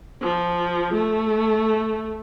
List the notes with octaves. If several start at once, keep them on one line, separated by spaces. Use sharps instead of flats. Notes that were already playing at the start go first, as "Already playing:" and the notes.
F3
A3